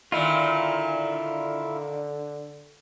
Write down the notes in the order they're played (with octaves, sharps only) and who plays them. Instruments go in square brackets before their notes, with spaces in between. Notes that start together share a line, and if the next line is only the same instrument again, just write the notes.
[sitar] A#2 D#3 [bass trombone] D3 [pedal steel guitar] E4 F4